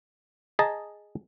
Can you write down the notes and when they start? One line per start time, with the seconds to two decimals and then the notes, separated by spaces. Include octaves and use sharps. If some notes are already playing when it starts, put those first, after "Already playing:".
0.59 G#4 D#5 A5 A#5